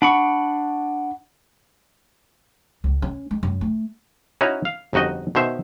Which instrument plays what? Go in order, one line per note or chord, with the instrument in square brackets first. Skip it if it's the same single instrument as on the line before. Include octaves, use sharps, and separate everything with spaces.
[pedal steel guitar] D4 B5 C#6 [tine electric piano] F#5
[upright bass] C#2
C#4
G#3
F#2
A3
[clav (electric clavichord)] C#4 D#4 E4 F#4 C#5
F5
G1 F2 D#4 F#4 D#5
B2 D#3 C5 E5